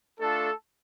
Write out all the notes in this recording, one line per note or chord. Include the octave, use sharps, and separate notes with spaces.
A3 D4 F4 A4